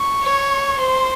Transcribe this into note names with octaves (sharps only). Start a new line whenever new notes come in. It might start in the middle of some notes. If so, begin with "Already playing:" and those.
Already playing: C#6
C#5
C5 C6